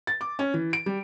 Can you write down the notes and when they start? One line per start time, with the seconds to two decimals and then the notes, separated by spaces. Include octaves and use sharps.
0.07 A6
0.21 D6
0.39 C#4
0.54 E3
0.73 D7
0.86 G3